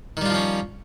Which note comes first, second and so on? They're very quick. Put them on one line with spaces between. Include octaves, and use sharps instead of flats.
D#3 G3 F4 F3 C#4